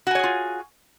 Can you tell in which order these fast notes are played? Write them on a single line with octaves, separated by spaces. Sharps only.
F#4 G#5 C#5 G#4 F4